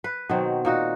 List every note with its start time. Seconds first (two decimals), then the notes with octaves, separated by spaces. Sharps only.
0.04 B4
0.29 B2 D#3 F#3 C4
0.65 A#2 D#4 F#4